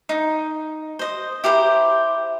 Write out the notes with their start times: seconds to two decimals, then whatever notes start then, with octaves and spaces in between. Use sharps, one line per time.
0.09 D#4
0.99 C5 D#5
1.44 E4 G4 A#4 C5